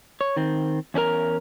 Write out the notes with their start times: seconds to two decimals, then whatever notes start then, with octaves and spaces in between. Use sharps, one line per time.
0.21 C#5
0.37 D#3 C4
0.94 E2 C#4 D4 A#4 A#5